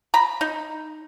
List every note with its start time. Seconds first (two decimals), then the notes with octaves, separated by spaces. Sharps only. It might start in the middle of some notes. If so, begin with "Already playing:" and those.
0.14 A#5 B5
0.41 D#4